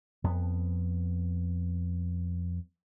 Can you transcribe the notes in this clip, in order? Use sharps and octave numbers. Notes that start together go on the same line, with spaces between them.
F2 B3